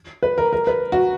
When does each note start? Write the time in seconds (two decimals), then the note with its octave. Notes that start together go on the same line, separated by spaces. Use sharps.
0.23 B4
0.38 A#4
0.53 A#4
0.67 B4
0.92 F#4